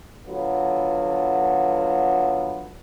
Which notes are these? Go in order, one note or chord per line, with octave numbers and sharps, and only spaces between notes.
D3 F#3 B3 F4